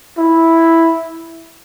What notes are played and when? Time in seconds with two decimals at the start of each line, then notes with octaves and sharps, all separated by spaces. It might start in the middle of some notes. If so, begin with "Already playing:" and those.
0.18 E4